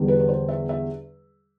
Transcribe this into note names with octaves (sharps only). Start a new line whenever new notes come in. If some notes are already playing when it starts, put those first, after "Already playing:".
Already playing: E2 D3 G3
B4
B4
C5
E5
E5